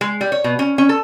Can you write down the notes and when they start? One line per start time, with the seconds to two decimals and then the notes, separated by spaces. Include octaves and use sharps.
0.01 G#3
0.21 G3
0.32 C#5
0.44 B2
0.59 C#4
0.78 C#4
0.89 A4